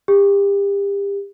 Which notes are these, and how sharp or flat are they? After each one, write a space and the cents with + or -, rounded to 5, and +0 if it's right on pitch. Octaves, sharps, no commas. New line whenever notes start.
G4 +30